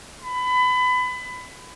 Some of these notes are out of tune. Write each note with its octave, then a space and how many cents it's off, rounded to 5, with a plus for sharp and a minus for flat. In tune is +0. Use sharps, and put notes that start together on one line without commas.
B5 +25